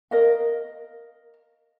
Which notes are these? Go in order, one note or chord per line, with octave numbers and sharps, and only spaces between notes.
A#4 D#5 F5